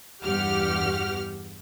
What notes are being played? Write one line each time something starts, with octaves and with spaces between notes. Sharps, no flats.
E2 G2 E3 G4 F#5 F6